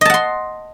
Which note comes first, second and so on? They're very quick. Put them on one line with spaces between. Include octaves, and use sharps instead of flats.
D#5 A5 F#5 C6